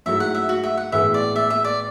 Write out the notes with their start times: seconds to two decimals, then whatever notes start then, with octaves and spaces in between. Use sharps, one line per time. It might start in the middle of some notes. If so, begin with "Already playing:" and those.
0.06 G#2 F#3 A3 E4 E5
0.20 F#5
0.35 E5
0.49 F#4
0.64 E5
0.77 F#5
0.92 A2 E3 G#3 B3 E5
1.14 D5
1.36 E5
1.50 E5
1.64 D5